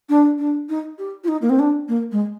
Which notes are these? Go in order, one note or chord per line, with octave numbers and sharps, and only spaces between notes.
D4
D4
D#4
G4
F4
D#4
A#3
C4
D4
A#3
G#3